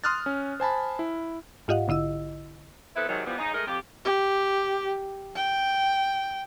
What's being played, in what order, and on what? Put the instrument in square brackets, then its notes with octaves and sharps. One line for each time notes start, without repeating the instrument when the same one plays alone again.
[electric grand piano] C6 D#6 F6 F#6 A6
C#4
C5 G#5 A5 B5
E4
[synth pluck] G#2 F4 G4 D#5 F5 F#5
A#1 D3 E4 D#5 E6
[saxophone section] B3 C4 E4 A4 B4
G#2 C3 D#3 F#3
E3 F3 G3 B3
G#2 C#3 D#4
G#3 A3 A#4 D#5
F2 F4 G4
[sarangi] G4
G5